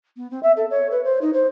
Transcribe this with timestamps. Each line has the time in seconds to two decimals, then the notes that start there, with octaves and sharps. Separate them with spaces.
0.16 B3
0.30 C4
0.43 E5
0.56 A4
0.70 C#5
0.91 B4
1.04 C5
1.21 D#4
1.33 C5